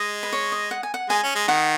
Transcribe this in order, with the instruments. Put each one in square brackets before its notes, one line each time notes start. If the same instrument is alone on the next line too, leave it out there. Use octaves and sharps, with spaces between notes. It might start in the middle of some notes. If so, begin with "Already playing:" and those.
Already playing: [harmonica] G#3 [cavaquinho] D#5
[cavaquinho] B4
C#5
D#5
F#5
G#5
F#5
[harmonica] G#3 [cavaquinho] G#5
[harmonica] C#4
G#3
[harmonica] D#3 [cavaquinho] F#5